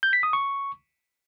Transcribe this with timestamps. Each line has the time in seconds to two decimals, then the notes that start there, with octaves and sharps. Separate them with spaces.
0.03 G6
0.13 B6
0.23 D#6
0.33 C#6